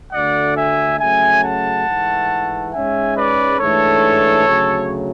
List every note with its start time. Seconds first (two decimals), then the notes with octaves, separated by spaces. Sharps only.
0.13 D2 D3 A3 D5 F#5
0.56 E5 G#5
0.99 C#3 F#3 A3 C#4 E5 G#5
1.43 F#5 A5
1.87 G#2 E3 A3
2.73 G#2 G#3 C#4 E5 G#5
3.16 B4 D5
3.60 G#2 E3 A3 D4 A4 C#5
4.46 D2 C#3 F#3 A3